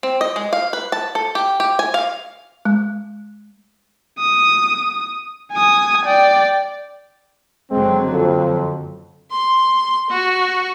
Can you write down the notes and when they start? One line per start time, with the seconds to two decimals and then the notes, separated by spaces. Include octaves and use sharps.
0.03 C4
0.21 D#5
0.36 G#3
0.53 F5
0.73 B4
0.92 A5
1.15 A4
1.35 G4
1.60 G4
1.79 G#5
1.94 F5
2.65 G#3
4.19 D#6
5.52 G#5 D#6
6.06 D5 G5
7.71 F#1 D3 F#3 G#3 C4
8.12 F2
9.31 C6
10.10 F#4